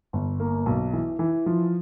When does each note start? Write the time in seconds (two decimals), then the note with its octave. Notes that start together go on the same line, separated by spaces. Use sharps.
0.13 G1
0.40 A#3
0.66 B1
0.93 E3
1.19 E3
1.46 F3